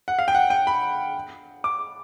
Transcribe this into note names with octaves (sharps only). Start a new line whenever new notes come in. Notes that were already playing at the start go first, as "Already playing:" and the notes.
F#5
F5
G5
F#5
G5
B5
D6